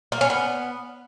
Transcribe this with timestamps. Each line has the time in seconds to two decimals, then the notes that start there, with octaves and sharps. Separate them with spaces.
0.12 A#3
0.21 C#4
0.30 B3